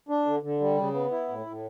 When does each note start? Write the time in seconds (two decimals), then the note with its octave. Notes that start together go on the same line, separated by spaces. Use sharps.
0.09 D4
0.26 D3
0.42 D3
0.60 G3
0.78 C#3
0.94 B3
1.11 E4
1.29 A2
1.46 A2